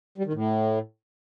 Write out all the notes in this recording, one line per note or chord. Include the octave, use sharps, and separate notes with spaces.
G3
D#3
A2